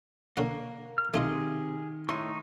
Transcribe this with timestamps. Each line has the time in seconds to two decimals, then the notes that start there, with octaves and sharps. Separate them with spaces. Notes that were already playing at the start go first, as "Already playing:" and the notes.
0.37 D3 A#3 C#4 F#5
0.98 F6
1.14 C3 D#3 A3 F4 G#4 D#5
2.09 A2 A3 D#4 E4 C6 C#6